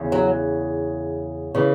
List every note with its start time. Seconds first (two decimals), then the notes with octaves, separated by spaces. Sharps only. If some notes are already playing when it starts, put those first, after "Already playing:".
Already playing: E2 C#3
0.12 F#3
1.55 C#3 E3